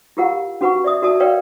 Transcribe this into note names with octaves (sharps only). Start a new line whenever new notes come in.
E4 F4 G4 A#4 F5 F#5
C#4 F#4 B4 F#5 B5 C#6
D5 E5 D#6
F#4 A#4 D5 E5 A5 D#6
A#4 B4 C#5 D5 F5 G5